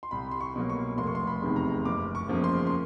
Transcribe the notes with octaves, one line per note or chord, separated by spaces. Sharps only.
C6
C2 B5
C6
C#6
B2 F#3 A#3
C#6
F1 C6
C#6
C6
B5
E2 C3 D#3 G#3
A#5
F#1 D6
C#6
E2 C#3 F3 A#3
C6
C6